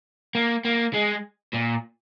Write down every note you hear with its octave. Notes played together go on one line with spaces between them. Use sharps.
A#3
A#3
G#3
A#2